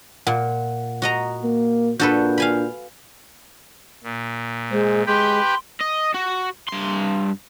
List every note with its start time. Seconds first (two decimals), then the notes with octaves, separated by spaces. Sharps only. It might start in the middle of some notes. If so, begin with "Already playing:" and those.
0.27 A#2 F#5
1.02 F#4 D#5 A#5
1.44 A#3
1.99 A#2 D4 F#4 A4 B4 G6
2.38 F5 G#5 B5
4.03 A#2
4.71 G#3 C5
5.07 G#3 G4 B4 G5 C6
5.81 D#5
6.15 F#4
6.69 G2 C6